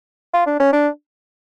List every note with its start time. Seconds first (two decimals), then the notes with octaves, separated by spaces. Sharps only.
0.34 F4
0.47 D4
0.60 C#4
0.73 D4